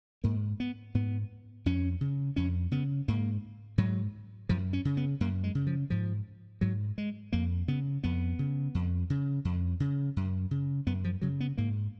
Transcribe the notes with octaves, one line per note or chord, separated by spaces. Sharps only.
G#2 A#3
B3
G#2 B3
F2 C#4
C#3
F2 C#4
C#3 B3
G#2 A#3
G#2 F#3
F#2 F3
C#4
C#3
B3
F#2 A#3
G#3
C#3
F3
G#2 F3
G#2 F#3
G#3
F2 A#3
C#3 B3
F2 B3
C#3
F2
C#3
F2
C#3
F#2
C#3
F#2 B3
F3
C#3 F#3
B3
G#2 A#3